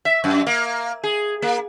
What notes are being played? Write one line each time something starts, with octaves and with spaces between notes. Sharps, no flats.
E5
F#2
A#3
G#4
A#3